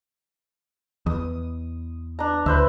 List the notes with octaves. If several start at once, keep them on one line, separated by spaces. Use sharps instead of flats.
E2 D#6
D4 A#5
D2 B4 C5 E5